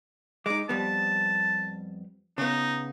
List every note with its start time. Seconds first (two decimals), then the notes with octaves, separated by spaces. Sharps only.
0.46 G#3 D#4 D6
0.69 F2 G3 B3 A5
2.38 C#3 B3 D#4